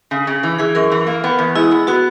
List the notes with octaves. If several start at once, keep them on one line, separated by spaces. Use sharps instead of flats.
C#3
C#3
E3
E3 G#4
F#2 A#4
E3
A#3
B3
E2
G#3 E4
B3
B3 F#4